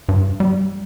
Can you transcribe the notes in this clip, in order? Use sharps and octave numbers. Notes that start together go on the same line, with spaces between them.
G2
G3